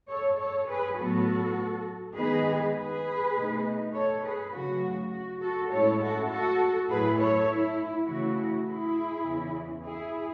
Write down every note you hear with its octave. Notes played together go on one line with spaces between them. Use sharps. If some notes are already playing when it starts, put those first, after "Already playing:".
A4 C#5
A4 C#5
G#4 B4
A2 F#3 B3 F#4 A4
D#3 G#3 B3 D#4 G#4 B4
G#4 B4
B2 A3 D#4
A4 C#5
G#4 B4
C#3 F#3 A3 F#4
F#4
F#4 A4
A2 G#3 C#4 E4 A4 C#5
F#4 A4
F#4 A4
A2 F#3 A3 E4 G#4 B4
A4 C#5
E4
C#3 E3 A3 E4 F#4
E4 G#4
E2 C#3 E3
E4 G#4